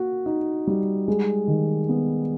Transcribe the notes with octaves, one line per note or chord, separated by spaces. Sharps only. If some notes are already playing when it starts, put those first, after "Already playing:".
Already playing: A#3 F#4
D#4
G3
G#3
D#3
B3